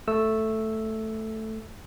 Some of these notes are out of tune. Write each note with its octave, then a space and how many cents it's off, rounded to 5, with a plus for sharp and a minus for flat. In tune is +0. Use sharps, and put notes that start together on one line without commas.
A3 +0 E6 +0